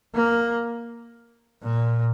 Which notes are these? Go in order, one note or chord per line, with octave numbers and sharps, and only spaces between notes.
A#3
A#2